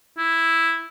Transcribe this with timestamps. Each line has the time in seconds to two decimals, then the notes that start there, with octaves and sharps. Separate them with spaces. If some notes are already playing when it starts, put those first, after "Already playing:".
0.18 E4